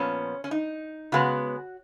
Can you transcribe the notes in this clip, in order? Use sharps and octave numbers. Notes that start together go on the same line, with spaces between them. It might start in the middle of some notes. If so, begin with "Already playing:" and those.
Already playing: A#2 F3 B3 C#4
C#4
D#4
C#3 G#3 B3 F#4